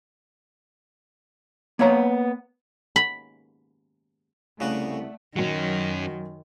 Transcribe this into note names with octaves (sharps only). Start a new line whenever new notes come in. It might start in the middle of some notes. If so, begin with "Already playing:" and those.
A#3 B3 C#5 A#5
B5
C2 C#3 A3 F#4 D5 F#5 D#6
F#2 D#3 F#3 C#4 F#4